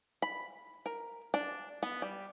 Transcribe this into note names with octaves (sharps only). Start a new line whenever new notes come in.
B5
A#4
D4
B3
G3